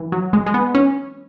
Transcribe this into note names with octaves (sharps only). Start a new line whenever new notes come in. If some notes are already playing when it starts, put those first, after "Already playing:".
Already playing: E3
F#3
G#3
G#3
B3
C#4